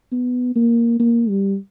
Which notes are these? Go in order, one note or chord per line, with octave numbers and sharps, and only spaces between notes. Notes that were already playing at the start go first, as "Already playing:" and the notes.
B3
A#3
A#3
G3